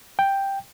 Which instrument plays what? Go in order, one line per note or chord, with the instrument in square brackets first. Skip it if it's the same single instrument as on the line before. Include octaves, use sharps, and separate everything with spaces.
[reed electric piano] G5